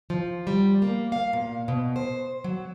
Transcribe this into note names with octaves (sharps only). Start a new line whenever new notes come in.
F3
G3
A#3
F5
A#2
B2
C5
F#3